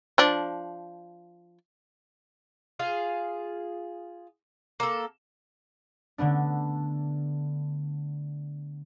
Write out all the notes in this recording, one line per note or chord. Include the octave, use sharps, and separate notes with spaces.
F3 D4
F4 G#4 F5
A#3 A4
D3 A3 B3 D4